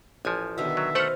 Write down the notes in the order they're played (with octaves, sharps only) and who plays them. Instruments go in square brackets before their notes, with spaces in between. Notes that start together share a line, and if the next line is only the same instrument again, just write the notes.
[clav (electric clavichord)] A1 F3 [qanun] G#5
[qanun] B2 D3 D#3 [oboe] E5
[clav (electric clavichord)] F#3
[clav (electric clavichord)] A3 A4 F#5 [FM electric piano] C5 F6 [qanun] D#5